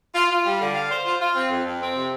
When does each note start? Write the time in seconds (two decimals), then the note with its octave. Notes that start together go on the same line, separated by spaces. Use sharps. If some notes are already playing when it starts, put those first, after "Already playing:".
0.15 F4
0.30 F4
0.46 G3
0.60 D3
0.75 F5
0.90 C5
1.05 F4
1.20 F4
1.35 C4
1.50 F2
1.66 F2
1.80 C4
1.95 C3